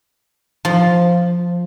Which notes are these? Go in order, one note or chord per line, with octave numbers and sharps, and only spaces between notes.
F3